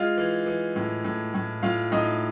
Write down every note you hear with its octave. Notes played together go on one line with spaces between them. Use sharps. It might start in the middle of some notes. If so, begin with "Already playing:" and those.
Already playing: G#3 F4 F5
E3
E3
A2
A2
A2
A2 F4 F5
A2 D#4 D#5